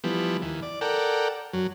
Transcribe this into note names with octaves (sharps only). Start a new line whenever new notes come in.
E3 F3 G3 B3
D#2 E3
D5
A4 A#4 D5 F#5 G5
F#2 F#3